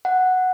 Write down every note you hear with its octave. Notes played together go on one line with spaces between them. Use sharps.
F#5